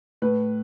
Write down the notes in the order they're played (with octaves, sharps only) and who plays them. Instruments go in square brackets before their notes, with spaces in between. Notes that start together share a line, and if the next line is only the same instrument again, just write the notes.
[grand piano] A2 B4